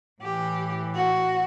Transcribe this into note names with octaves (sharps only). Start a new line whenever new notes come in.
A2 E3 G4
F#4